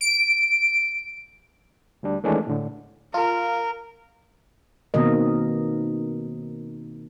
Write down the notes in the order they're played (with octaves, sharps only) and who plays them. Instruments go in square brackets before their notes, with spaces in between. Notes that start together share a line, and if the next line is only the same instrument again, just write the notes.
[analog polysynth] D7
[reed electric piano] D2 G3 D4
D#3 E3 G#3 A3 C#4 D4
A2 D3
[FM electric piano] F4 [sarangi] A#4
[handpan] B2 D#3 A#3 C4 A#4 D#5